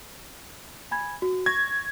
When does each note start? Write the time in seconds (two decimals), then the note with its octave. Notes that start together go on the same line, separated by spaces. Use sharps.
0.91 G#5 B5 G#6
1.22 F#4
1.46 C#6 G#6 A#6